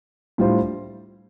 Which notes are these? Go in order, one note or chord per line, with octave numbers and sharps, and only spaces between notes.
A2 G3 D4 F4 C5